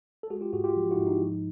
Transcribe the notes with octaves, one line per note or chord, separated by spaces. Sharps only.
A4
G#3 F#4 G#4
F4 G4
G#2 F#4 G#4
F4 G4
F3
E4 F#4
G#2
D#4
F3